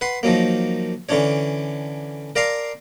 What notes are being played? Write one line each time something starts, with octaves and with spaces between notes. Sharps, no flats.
B4 F#5 C6
D#3 F3 F#3 A#3
D3 E3 C#4 D4 C#5
A#4 D5 F5 A5 A#5 C6